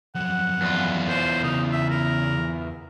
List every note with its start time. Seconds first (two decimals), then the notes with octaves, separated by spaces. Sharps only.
0.15 F2 F#3 F#5
0.62 E2 F4
1.09 A#4 C5 C#5
1.43 C#3 D#4
1.71 E5
1.90 A#4